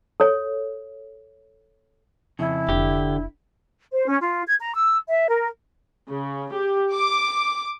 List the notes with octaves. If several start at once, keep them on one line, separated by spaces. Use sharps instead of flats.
A4 C#5
F2 C#3 E4
F1 D3 G4
C5
C#4
F4
G#6
A#5
E6
E5
A#4
C#3
G4
D6